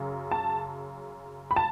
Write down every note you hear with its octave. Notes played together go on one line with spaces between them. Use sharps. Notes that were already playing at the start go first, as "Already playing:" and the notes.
Already playing: F#2 C#3
A5
B5
A5